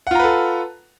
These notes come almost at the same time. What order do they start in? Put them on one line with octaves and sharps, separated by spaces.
F#5 F4 A#5 B4 A4